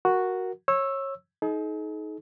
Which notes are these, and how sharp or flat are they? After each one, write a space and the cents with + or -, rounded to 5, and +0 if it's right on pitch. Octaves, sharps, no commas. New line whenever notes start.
F#4 +0 A#4 +0
C#5 -25 E6 +0
D#4 +20 G#4 +45